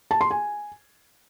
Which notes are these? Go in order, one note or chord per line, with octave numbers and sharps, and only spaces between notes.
A5
C6
G#5